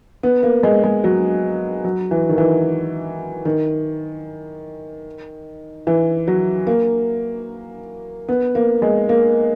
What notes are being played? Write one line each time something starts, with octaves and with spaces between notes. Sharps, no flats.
B3
A#3
G#3
G#3
F#3
F#3
E3
D#3
E3
D#3
E3
F#3
A#3
B3
A#3
G#3
A#3